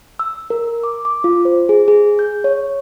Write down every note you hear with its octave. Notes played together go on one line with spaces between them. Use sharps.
E6
A#4
D6
D6
F4
C5
G#4
G#4
G6
C#5